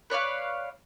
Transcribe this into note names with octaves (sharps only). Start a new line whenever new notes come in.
B4 C#5 D5 F5